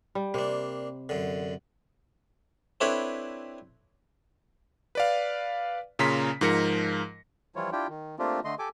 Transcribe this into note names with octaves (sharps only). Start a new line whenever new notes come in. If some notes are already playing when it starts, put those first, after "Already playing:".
G3
C3 A#3 D4
F#2 D3
C4 D4 E4 A4 B4 C#5
B4 D5 F5
A#2 C#3 C#4 A#5 C6 B6
G#2 F3 A#4 A#6 C#7
E3 F3 G3 E4 F4 C#5
D4 E4 F4 G4 G5
D#3
A3 A#3 C4 D4 F4 G4
D3 A3 D#5 C6
G4 A4 G#5 D6